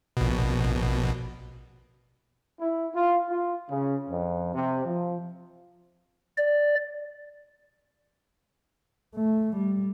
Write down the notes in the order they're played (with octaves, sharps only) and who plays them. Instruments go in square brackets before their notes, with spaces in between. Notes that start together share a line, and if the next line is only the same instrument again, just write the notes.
[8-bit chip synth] A#1 B2
[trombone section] E4
F4
F4
C#3
F2
C3
F3
[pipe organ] D5
[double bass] A3
G3